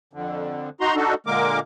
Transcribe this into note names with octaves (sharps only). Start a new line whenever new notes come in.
F2 D3
D#4 F#4 A#5 C6
D4 D#4 F#4 A4
A#2 D3 G#3 A#3 A#4 D6